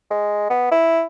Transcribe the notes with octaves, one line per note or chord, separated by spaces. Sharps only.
G#3
B3
E4